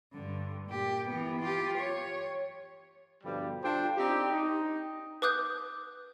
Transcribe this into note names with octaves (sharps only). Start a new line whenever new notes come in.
G2 D3
A#2 G4
E3 B3
F4 G4
C#5
G2 B2 D3 F3 G3
D4 F4 G4 A4 C5 G5
C4 D4 D#4 G4
D#4
B4 D6 D#6 F#6 G6